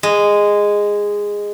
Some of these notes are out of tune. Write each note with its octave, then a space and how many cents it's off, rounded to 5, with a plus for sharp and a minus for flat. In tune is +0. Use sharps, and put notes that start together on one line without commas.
G#3 -10